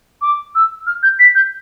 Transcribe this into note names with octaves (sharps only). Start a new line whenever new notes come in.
D6
E6
F6
G6
B6
G6